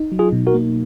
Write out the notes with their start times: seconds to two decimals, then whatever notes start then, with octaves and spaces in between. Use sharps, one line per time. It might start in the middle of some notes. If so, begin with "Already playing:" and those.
Already playing: D#4
0.12 F#3
0.19 F4 G#4
0.32 B2
0.47 F#4 A#4
0.54 A#3